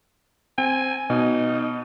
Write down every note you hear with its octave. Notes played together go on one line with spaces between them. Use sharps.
C4 G#5
B2 D#4